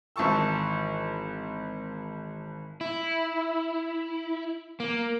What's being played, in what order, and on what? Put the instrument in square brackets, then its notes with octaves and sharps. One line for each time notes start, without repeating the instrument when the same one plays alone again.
[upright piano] G#1 E3 A5 C#6 E6
[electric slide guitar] E4
A#3